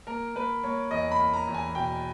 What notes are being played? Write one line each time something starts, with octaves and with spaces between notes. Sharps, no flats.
A#3 A#4
A#3 B4
A#3 C#5
E2 D#5
B5
A#3
A#5
E2
G#5
B2 G5